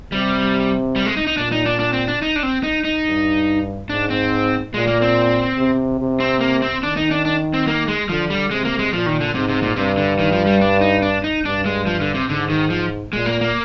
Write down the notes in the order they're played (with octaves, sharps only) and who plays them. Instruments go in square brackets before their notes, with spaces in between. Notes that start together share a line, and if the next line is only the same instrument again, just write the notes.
[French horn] C3 [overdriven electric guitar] G3
[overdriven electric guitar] G3
G#3
D#4
D#4
[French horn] A#2 [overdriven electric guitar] D4
[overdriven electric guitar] D#4
D4
D4
C4
D4
D#4
D4
C4
D#4
D#4
[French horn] G2
[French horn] G#2 [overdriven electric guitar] D4
[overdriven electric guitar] C4
[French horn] A#2 [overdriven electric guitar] G#3
[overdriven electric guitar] A#3
C4
[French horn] C3
C3
[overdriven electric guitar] C4
A#3
C4
[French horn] D#3 [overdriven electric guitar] D4
[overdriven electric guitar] D#4
D4
D4
C4
A#3
G#3
[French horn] D3 [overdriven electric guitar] F3
[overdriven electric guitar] G3
[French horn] C3 [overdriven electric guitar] G#3
[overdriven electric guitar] A#3
G#3
[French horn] A#2 [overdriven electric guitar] F3
[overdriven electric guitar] D#3
D3
[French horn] G#2 [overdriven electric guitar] C3
[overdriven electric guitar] C3
A#2
[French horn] G2 [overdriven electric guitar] C3
[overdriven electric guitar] D3
D#3
F3
G3
D4
D#4
D4
D#4
[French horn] G2 [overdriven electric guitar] D4
[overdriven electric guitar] G#3
F3
D3
C3
[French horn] G#2 [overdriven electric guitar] D3
[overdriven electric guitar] D#3
F3
[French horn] A#2 [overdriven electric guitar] G#3
[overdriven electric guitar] A#3
A#3